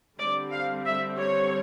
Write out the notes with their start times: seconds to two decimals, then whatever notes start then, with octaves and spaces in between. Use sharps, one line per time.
0.19 D3 G3 C4 D5
0.52 F5
0.84 E5
1.17 C#5